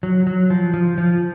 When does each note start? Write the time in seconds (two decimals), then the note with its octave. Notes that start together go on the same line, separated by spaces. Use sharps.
0.03 F#3
0.27 F#3
0.50 F3
0.74 F3
0.98 F3